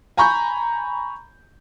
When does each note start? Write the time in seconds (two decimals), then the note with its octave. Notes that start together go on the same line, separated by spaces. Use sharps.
0.17 G#5 A#5 B5 C#6 G6